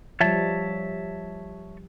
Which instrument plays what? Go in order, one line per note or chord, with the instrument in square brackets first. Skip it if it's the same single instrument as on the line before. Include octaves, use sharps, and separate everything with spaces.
[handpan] F3 G3 [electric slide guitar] C#5 E5 A5